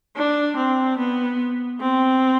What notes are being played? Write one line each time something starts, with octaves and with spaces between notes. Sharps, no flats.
D4
C4
B3
C4